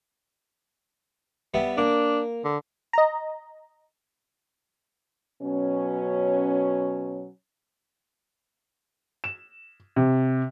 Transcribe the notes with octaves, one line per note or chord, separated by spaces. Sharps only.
G3 B3 E5
A#3 D4
D3
D#5 A#5
B2 F#3 C#4
E7
C3